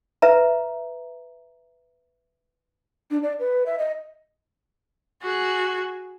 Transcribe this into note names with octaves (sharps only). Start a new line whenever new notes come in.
B4 E5 A#5
D4
D5
B4
E5
D#5
F#4 G#4